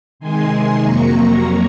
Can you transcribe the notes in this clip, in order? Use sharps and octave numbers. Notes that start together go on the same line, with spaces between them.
C3 D#3 G#3 G#5 C6
F2 C3 F#3 A#3 A#5 C#6